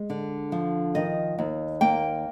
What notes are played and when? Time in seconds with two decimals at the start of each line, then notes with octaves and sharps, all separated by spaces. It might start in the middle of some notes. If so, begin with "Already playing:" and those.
Already playing: G#3
0.10 D3
0.52 F3
0.95 D#3 D#5
1.39 D#2
1.81 A#3 G5